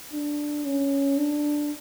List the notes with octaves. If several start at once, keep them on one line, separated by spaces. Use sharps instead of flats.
D4
C#4
D4